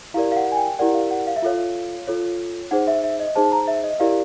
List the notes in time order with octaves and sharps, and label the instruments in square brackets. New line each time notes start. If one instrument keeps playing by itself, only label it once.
[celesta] E4 G4 A#4 D5 F5
F5
F#5
G#5
G5
E4 G4 A#4 D5 F#5
F5
F#5
F5
E5
F4 A4 C#5 F5
F4 A4 C#5
D#4 G#4 C5 F#5
E5
E5
D#5
D#4 G#4 C5 A5
A#5
E5
D#5
E4 G4 A#4 D5 F5